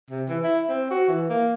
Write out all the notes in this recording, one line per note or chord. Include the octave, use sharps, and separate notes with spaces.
C3
E3
E4
C4
F#4
E3
A#3